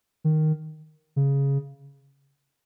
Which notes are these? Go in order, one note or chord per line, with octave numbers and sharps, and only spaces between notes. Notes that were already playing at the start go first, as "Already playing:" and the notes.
D#3
C#3